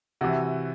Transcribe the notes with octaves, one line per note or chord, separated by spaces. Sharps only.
C3 E3 F#4